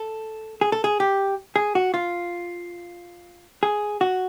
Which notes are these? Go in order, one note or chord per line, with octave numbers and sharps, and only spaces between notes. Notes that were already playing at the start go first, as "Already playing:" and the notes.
Already playing: A4
G#4
A4
G#4
G4
G#4
F#4
F4
G#4
F#4